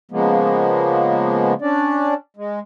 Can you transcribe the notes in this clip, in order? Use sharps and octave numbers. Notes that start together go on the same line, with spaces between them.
C#3 F3 G#3 A#3 B3
C#4 D4 D5
G#3